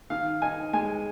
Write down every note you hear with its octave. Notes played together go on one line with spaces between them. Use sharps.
D#3 F5
D#4 G#5
G#3 G#5